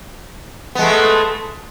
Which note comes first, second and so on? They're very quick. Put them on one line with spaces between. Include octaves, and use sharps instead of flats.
B3 G#3 A3